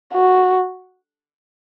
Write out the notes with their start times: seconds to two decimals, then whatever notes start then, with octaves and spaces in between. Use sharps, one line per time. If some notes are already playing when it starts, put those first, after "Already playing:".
0.14 F#4